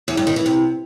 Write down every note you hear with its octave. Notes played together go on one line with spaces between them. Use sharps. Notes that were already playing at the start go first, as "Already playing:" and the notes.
E2
G2
D#3
E3
C3